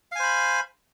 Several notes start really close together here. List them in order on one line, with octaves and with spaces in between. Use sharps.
F5 G#5 C5 B5